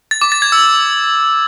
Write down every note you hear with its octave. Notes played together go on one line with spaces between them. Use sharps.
A6
D6
A6
G#6
E6